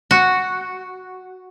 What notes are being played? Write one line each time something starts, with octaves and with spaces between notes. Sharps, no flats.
F#4